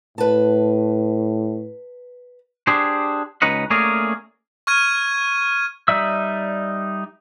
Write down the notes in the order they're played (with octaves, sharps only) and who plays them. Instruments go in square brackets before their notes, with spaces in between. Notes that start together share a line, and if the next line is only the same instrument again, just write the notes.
[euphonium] A2 [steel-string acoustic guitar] B4 A5
[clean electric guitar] D4 G4 G#4 C5
C#2 C#4 D#4 B4 D#5 F#5
A3 A#3 C#4 G#4 A#4 D5
[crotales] C#6 F6 G#6 D#7
[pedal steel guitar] G3 D#4 D5 E5 E6